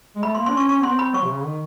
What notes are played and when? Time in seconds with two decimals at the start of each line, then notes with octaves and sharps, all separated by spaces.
0.16 G#3
0.23 A3 B5
0.35 C6
0.38 A#3
0.46 D4 C6
0.53 C#4 C#6
0.69 C#4 C#6
0.82 B3 C6
0.91 C4
0.99 B5
1.14 F#3 C#6
1.23 C3
1.29 C#3
1.44 D#3